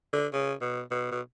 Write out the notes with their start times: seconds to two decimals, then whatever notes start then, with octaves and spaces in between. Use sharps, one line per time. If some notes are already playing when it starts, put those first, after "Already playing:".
0.13 D3
0.33 C#3
0.61 B2
0.91 B2
1.11 B2